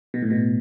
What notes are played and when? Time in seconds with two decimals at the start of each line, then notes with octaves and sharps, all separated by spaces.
0.14 B2
0.22 A2
0.30 B2